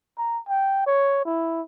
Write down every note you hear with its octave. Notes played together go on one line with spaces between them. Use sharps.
A#5
G5
C#5
E4